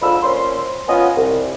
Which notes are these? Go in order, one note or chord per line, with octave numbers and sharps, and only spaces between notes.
G#2 D3 F4 B5 E6
A#2 C#4 C5 C6
B3 C#4 F4 D#5 F#5 G#5
C2